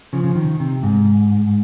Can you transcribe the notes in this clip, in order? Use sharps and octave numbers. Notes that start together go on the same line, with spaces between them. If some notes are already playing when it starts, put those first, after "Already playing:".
C#3 F3
C#3
D#3
C3
G#2